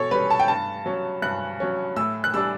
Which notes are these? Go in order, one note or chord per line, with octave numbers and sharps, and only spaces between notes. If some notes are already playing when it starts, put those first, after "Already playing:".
Already playing: B2 A4 C#5
G3 C#4 B4
A5
G5
G2 A5
F#3 C#4
G2 F#6
F#3 C#4
A2 E6
F#6
G3 D4 E6